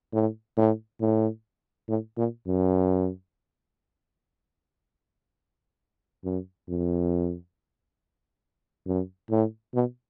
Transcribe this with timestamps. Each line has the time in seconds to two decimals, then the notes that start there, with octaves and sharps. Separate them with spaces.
0.13 A2
0.57 A2
1.01 A2
1.88 A2
2.17 A#2
2.47 F#2
6.25 F#2
6.69 F2
8.87 F#2
9.30 A2
9.74 B2